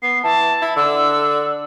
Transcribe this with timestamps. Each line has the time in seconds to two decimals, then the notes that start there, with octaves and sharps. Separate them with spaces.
0.03 B3 C7
0.24 E3 A5
0.62 E4
0.77 D3 E6